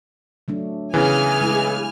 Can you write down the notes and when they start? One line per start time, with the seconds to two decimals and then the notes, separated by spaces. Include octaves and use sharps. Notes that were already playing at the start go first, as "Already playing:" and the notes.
0.48 F#3 A3 D4
0.94 C#3 E3 B3 G#4 G#5 F6
1.41 G#3 E4